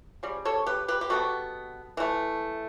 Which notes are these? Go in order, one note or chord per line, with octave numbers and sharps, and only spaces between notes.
C#3 G3
A4 C#5
G4 B4
G4 B4
G4
B2 G3 B3 F#4 A4
E3 A3